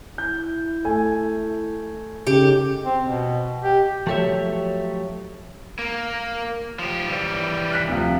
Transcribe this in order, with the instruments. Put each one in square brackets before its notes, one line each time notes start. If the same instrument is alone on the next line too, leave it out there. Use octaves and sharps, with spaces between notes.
[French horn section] E4 [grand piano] G6
[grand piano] A3 G#5
[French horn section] F#2 D#4 A4 [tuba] C#3 [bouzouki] G4
[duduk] C4
B2
G4
[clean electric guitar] F3 F#3 A3 G4 C#5 E5
[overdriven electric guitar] A#3
F3 G4
E3 G3
[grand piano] F6 F#6 B6
D2 C3 F3